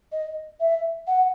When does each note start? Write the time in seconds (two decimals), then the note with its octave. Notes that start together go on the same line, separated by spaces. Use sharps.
0.12 D#5
0.60 E5
1.07 F#5